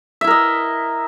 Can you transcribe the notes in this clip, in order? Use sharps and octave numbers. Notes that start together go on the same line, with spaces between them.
E4 A#4 D#5 E5